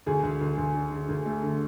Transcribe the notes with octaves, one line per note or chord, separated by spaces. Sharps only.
D2 G#4
D2
D2
D2
D3
D3
D2
A3
D3